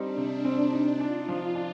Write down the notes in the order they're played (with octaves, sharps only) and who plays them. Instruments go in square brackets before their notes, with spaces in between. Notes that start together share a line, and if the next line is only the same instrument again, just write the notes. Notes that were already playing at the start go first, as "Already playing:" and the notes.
Already playing: [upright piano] G3 C4 D#4 [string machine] D4
[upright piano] C3
C4
D#4
[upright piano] D4 [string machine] F4
[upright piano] F3
D4